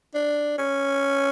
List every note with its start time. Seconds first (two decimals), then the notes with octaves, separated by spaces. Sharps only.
0.15 D4
0.58 C#4